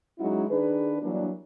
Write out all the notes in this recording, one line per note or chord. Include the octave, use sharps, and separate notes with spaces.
F#3 G#3 C#4 D#4 E4 F#4
D#3 D4 G#4 B4
E3 F#3 G3 A#3 D4